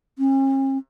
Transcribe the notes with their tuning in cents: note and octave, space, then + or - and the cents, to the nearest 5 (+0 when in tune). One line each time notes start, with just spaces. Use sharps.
C#4 -45